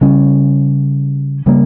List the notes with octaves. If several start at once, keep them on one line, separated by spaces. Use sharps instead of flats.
C#3 G3 C#4
C#3 G3 A#3